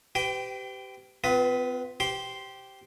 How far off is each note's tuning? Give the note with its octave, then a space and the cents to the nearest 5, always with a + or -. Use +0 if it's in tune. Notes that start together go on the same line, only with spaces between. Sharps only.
G4 -15 B4 +45 G5 +0
C4 -45 F4 +0 B4 +5
G4 -10 C5 +0 C6 +0